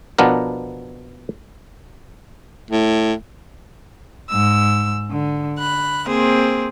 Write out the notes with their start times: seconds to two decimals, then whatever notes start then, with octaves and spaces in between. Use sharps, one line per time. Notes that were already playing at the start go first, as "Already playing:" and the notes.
0.18 B2 F3 B3 D4 A#4
2.71 A2
4.30 G#2 E6
5.11 D3
5.57 B5 F#6
6.06 A#3 C4 G#4 C5